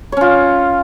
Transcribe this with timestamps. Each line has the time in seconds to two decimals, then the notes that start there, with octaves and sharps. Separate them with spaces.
0.12 C#5
0.17 C#4
0.21 F4